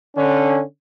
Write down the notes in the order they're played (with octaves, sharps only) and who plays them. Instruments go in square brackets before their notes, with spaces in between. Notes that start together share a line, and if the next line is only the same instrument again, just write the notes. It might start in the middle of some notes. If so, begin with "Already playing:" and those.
[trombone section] D3 C#4